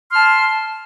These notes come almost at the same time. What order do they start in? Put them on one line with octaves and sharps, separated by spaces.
C6 F6 A5